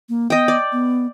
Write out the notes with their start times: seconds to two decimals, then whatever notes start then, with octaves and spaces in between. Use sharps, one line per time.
0.09 A#3
0.30 B3 D#5 G5
0.48 D5
0.72 B3